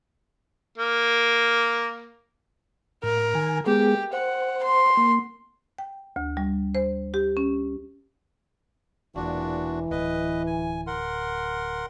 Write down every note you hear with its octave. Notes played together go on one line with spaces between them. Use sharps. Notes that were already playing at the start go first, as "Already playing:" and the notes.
A#3
A2 A#4
D#3 G#5
G#3 B3 G4 G#4
C5 F#5
C6
A#3
G5
D2
G3
C5
G4
C#4
E1 A#2 E3 D4 F#4
D1 B4 D#5
G#5
A#4 F#5 C6